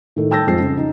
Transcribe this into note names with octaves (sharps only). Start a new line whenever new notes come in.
A2 D#3 A3
G5 A5 E6 G6 A6 A#6
F2 F3 G#3 E6 C7
C#3
D#4